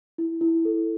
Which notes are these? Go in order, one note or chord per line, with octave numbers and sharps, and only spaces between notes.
E4
E4
A4